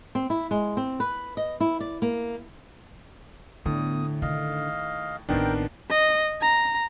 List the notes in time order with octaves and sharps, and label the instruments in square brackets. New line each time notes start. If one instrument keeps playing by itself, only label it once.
[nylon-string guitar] C4
E4
G#3
C4
B4
D#5
E4
D5
A#3
[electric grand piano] A2 [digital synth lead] D3 [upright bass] B3 [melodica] D#6
[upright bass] D#3 [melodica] D#5 F5
[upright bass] A1 C4 [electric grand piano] D#3 B3 D4 [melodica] A#4 [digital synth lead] G5
[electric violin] D#5
A#5